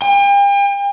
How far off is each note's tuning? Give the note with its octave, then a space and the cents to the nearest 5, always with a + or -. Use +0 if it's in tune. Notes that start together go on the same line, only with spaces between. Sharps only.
G5 +40